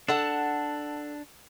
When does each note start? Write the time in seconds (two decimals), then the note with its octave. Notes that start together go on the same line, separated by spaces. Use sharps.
0.08 D4 A4 F#5 A5